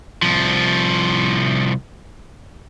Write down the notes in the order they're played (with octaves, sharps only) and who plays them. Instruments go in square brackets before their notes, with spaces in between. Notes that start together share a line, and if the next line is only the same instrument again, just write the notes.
[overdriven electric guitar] C2 F3